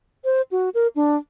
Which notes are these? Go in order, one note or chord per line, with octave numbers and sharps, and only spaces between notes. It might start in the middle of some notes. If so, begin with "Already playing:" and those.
C5
F#4
A#4
D4